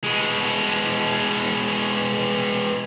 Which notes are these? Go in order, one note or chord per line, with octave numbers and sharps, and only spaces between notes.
B2 G#3